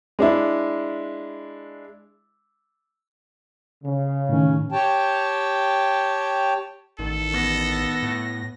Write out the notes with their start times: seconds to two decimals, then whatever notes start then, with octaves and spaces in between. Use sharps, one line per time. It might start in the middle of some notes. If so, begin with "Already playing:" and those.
0.19 G#3 D4 E4
3.84 C#3
4.29 A2 D#3 C#4
4.71 G4 C#5 G5 A5
6.99 A1 D#3 A4
7.32 B3 A#6
8.03 A2